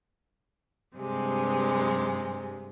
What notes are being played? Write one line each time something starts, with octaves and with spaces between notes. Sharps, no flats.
G2 C3 G#3